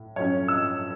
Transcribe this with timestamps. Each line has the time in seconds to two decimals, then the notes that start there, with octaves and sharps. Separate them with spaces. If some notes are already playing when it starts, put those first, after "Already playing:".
Already playing: A2
0.16 A2 F#3 C#4 C#5
0.48 E6